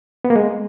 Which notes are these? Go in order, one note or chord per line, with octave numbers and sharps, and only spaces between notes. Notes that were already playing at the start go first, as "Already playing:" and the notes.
B3
A#3
G#3